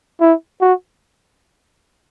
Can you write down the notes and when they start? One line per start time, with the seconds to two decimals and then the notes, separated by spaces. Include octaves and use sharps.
0.21 E4
0.61 F#4